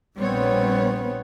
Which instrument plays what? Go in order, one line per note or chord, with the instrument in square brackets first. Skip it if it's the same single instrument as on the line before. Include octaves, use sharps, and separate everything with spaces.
[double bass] A#1 B3 [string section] G3 C4 C#5